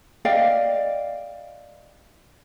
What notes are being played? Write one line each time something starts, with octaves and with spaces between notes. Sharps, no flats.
D5 D#5 F5 G5